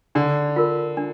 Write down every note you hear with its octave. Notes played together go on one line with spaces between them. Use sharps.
D3 D4
F4 A#4
D4